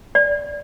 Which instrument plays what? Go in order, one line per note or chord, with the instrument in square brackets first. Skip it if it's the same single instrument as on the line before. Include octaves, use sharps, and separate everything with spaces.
[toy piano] D5